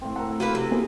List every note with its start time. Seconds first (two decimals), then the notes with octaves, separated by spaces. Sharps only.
0.01 A2 C4
0.16 A4 A#4 F#5
0.40 F3 A#3 F#4 B4
0.55 C3
0.71 A#3 B3 E4 G#4 C5